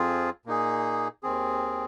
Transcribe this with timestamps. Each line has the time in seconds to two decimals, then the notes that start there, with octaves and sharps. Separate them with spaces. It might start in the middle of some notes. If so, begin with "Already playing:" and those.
Already playing: F2 F3 C4 F4 G#4
0.45 A#2 A#3 D#4 G#4
1.23 D#2 D#3 C4 G#4